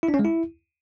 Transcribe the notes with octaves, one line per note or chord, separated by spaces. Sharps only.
E4
D4
C#4
G#3
E4